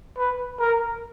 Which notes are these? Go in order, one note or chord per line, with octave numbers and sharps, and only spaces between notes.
B4
A#4